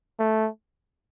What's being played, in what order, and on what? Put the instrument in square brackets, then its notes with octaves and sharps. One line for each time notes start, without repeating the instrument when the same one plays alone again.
[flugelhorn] A3